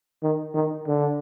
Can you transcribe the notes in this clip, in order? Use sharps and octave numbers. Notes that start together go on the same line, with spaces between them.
D#3
D#3
D3